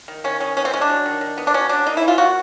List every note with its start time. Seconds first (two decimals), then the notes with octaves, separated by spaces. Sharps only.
0.08 D#3
0.24 D#3 C#4
0.40 D#3 C#4
0.57 B3 C#4
0.65 C4
0.73 G#3 C#4
0.81 D4
0.90 F#3
1.06 D#3
1.21 D#3
1.38 B3
1.47 D4
1.54 F#3 C#4
1.69 F#3 D4
1.86 A#3 D#4
1.97 E4
2.02 E3
2.08 F4
2.18 A#3 F#4